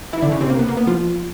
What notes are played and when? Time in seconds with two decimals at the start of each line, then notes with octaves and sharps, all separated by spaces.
0.13 E3 E4
0.22 D3 D4
0.32 C#3 C#4
0.41 C3 C4
0.50 A#3
0.59 B3
0.69 A#3
0.77 B3
0.87 F3 F4